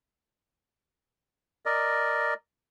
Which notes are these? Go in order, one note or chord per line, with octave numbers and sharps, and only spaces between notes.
A#4 D5 D#5